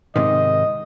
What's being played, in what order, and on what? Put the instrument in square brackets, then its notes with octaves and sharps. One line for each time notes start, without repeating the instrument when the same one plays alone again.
[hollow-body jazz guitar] G#2 C3 D#3 [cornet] D#5